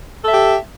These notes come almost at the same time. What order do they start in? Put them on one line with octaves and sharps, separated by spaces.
A4 E5 G4